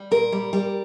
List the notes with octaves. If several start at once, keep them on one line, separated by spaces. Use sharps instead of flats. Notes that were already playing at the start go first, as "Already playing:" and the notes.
Already playing: G3
A#2 A#4
G3
G3